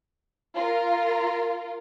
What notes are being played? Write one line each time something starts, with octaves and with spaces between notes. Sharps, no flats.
F4 A#4